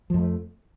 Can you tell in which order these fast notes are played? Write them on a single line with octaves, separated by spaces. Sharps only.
F3 F2 A3